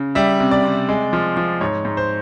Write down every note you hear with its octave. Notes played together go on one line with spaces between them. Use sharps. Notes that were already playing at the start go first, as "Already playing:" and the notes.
Already playing: C#3
G3 E5
C3
D5
C3
G#3
F3
F3
G#2 C#5
G#2
C5